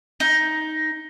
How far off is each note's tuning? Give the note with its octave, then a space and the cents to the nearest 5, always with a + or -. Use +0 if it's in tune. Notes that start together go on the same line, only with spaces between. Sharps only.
D#4 +10